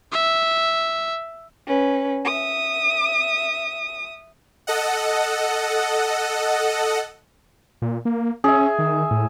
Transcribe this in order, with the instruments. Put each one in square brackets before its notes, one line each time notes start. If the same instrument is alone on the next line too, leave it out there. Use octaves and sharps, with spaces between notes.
[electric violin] E5
[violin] C#4 B4
E5 D#6
[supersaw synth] A4 D#5 F#5
[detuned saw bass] A#2
A#3
[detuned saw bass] C#4 [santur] G#4 E5
[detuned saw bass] D#3
A2